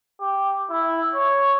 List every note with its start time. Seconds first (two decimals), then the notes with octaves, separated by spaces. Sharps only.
0.21 G4
0.70 E4
1.14 C#5